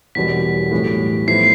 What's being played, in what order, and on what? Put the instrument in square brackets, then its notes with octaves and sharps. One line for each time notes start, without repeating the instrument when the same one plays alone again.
[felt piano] E1 E2 B2 G3 [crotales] B6
[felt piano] B1 A2 E3 G3
[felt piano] A2 F3 B3 E4 [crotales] C7